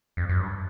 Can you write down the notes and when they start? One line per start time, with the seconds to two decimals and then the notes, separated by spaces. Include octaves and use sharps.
0.17 F2
0.29 F#2
0.40 G2